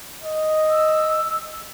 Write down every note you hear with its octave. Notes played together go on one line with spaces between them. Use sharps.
D#5
E6